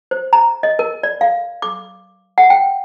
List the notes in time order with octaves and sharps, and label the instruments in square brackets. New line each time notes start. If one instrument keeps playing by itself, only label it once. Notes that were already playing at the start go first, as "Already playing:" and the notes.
[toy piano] C5
A#5
D#5
A#4
D5
F5
D6
F#5
G5